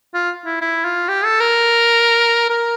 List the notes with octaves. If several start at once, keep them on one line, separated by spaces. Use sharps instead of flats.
F4
E4
E4
F4
G4
A4
A#4
A#4